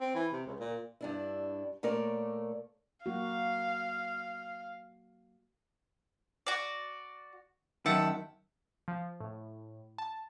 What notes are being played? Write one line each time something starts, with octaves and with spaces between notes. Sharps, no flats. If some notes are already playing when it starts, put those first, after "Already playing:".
C4
E3
C3
C#2
A#2
G2 D4 E4
A#2 A3 A4 A#4 C#5 D5
F#3 A#3 F#4 F5
F#4 D5
F#2 D#3 E5 F#5 A5
F3
A2
A5